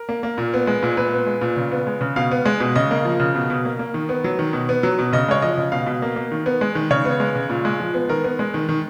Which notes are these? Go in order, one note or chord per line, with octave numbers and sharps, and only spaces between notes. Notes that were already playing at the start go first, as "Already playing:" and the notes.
Already playing: A#4
A#3
A#3
A#2
B3
G#3
A#2
A#2 B4
B3
G#3
A#2
C#3
B3
G#3
C#3
B2 F5
B3
G#3
B2
C#3 D#5
A#3
F3
C#3
B2
B2
A#3
A#3
D#3
B3
F#3
D#3
B2
B3
F#3
B2
C#3 D#5
G#3 C#5
F3 D#5
C#3
B2 F5
B2
A#3
A#3
D#3
B3
G#3
D#3
C#3 C#5
B3
G#3
C#3
A#2
G#3
F3
B3
D#3 A#4
B3
G#3
D#3
D#3